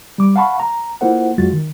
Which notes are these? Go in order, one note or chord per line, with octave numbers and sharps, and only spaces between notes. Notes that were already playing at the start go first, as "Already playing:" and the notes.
G3 D6
F5 F#5 A5 B5 C#6
A#5
A#3 E4 F4 A4 C5 F#5
F2 F#3 G#3 F4 F#4 A6
D#3